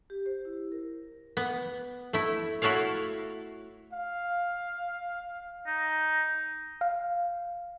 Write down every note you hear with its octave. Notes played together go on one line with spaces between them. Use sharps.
G4
C5
E4
A#4
B3
A3 E4
E4 F#4 A4 C#5 F5
F5
D#4
F5